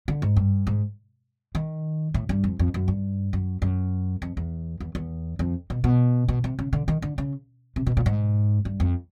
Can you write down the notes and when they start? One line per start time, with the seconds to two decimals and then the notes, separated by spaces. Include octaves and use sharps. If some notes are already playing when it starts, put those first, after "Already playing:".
0.08 D3
0.22 G#2
0.36 G2
0.67 G#2
1.55 D#3
2.14 A2
2.29 G2
2.44 F2
2.59 F2
2.74 F#2
2.88 G2
3.33 F#2
3.62 F#2
4.22 F2
4.37 E2
4.80 E2
4.95 E2
5.39 F2
5.70 B2
5.84 B2
6.28 B2
6.44 C3
6.59 C#3
6.73 D3
6.88 D#3
7.02 D3
7.18 C#3
7.76 C3
7.87 B2
7.97 A#2
8.06 G#2
8.65 G2
8.80 F2